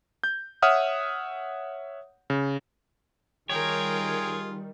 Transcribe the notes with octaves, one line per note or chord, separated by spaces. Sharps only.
G6
C#5 E5 F#5 D#6 F6
C#3
D#3 G3 F4 G#4 A#4 C#5 G5